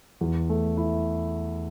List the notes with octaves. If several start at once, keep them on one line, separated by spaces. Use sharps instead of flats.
E2
A3
E4